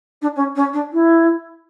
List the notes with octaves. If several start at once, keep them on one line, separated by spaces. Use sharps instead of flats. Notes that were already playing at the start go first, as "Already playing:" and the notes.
D4
C#4
C#4
D4
E4